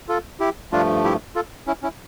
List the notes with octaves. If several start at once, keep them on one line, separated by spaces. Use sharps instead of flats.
F4 A4
E4 G4
G2 F3 A3 D4 F4
E4 G4
F4 A4
C#4 E4
C#4 E4